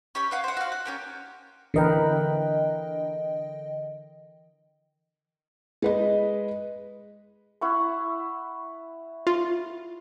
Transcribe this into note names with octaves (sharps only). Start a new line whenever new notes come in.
C#4 G4 B5 C#6
B4 F5 F#5
C5 F#5
F#4 F5
F#5
C#4 G4 A#4
D3 E3 A#4 B4 D#5 G5
G#3 B4 D#5
E4 F#5 C#6
F4